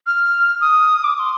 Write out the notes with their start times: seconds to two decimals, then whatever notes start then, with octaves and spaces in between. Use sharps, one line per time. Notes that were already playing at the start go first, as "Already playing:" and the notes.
0.07 F6
0.61 D#6
1.04 D6
1.14 D6
1.19 C6